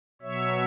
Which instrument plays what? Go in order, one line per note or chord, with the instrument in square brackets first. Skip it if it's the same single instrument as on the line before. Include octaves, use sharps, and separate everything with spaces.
[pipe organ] B2 F#3 C#5 E5